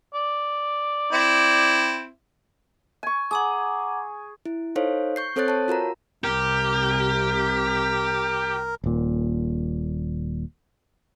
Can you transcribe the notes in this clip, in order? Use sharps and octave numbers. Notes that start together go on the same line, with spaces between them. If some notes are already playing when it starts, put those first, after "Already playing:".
D5
C4 E4
G#5 C#6
G#4 F#5 A#5 D6
E4
D#4 A4 C5 C#5 F5
C#6 G6 C7
C4 A4 C5 C#5 F#6 A6
C#5 A5
F4 F#4 A#4 A#5
C2 C3 G4 A#4
D#1 A#2